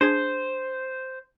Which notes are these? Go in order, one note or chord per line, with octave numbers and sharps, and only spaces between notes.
D4 G#4 C5 G#6